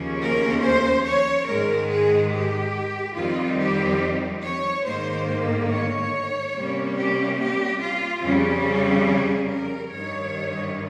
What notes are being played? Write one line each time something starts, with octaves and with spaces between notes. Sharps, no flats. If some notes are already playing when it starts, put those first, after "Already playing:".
Already playing: D#2 C#3 F3 A#3 C#4
A#4
C5
C#5
G#2 D#3 G#3 A#4
G#4
G4
F2 D#3 G3 C4 D#4 F4
G4
C#5
G#2 D#3 A#3 C5
C#5
C3 G3 A#3 C#4
G4
G4
F4
F2 C#3 G3 C#4
G#4
A#4
G2 D#3 G3 C#5